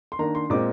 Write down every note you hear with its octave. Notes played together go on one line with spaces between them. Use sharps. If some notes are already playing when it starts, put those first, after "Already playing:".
C6
D#3 A#3 D4 A#5
C6
A#2 G#3 C4 D6